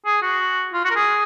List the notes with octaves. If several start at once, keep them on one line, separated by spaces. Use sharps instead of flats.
G#4
F#4
F4
F#4
A#4
G#4